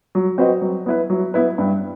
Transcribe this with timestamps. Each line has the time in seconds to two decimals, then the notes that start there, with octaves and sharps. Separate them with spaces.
0.15 F#3
0.38 C4 F#4 B4 D#5
0.62 F#3
0.86 B3 E4 B4
1.10 F#3
1.34 B3 E4 B4
1.58 G2